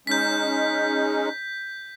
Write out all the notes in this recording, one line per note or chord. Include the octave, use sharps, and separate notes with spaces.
G#3 C#4 D#4 G6 B6